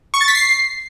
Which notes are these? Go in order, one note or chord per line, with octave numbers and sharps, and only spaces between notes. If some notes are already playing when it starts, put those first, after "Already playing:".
C#6
A6
B6
C7